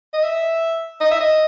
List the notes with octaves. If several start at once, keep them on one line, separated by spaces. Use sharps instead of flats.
D#5
E5
D#5
E5
D#5